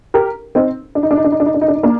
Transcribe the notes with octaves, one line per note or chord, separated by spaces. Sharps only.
G4 A#4
C4 D#4
D4
D#4
D4
D#4
D4
D#4
D4
D#4
D4
D#4
D4
D#4
A#3 D4